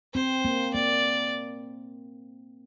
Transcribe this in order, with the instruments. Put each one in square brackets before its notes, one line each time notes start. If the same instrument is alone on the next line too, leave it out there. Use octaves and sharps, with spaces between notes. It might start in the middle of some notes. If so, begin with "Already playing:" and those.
[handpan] C4 [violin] C5
[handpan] A#3
[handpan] A#3 [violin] D5